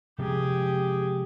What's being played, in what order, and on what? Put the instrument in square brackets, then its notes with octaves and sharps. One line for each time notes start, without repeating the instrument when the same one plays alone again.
[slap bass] C3 F3 G#3 [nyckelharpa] G4 G#4